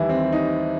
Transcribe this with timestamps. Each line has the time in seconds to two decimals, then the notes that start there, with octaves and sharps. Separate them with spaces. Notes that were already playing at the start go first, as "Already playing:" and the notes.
Already playing: D#2 D#3 E3 G3 E4
0.09 C4
0.32 D#4